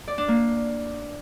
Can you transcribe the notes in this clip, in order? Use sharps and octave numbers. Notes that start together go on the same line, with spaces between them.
D5
D4
A#3